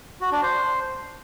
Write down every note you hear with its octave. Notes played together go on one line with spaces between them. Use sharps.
F#4
D4
C5